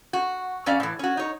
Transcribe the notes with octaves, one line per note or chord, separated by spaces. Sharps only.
F#4
F2 C#4 D5 F5
A2 E3
C#4 F#4
D#4 C#5